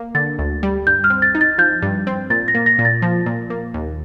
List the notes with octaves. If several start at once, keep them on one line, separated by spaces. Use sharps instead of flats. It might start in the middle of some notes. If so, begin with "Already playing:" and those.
Already playing: A#3
D3 A6
D2
G3
G2 G6
F6
C4
A6
D#4
A6
F3 G6
G2
C4
A#2 A6
A#6
A#3
A#6
A#2
A6
F3
A#2
A#3
D#2